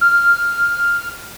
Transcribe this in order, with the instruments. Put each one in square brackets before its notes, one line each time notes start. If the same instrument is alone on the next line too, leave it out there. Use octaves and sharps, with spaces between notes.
[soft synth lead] F6